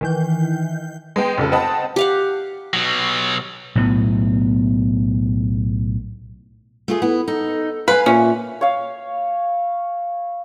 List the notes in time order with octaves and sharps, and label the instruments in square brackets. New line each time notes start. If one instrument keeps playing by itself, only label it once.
[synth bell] D#3 E3 G6
[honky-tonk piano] G#3 B3 G5
F1 C#3 A4
C4 D#5 F#5 A5 B5
[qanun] G4 F5 F#5
[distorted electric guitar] B2 F#3
[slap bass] B1 A2 B3
[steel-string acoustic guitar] A3 F4 G#4
[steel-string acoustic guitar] B3 [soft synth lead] E4
[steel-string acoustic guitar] D#4 [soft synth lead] A4
[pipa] B4 [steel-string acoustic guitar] F5 G#5
[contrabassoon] A#2 [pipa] C#4 [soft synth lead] E5
[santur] C#5 F5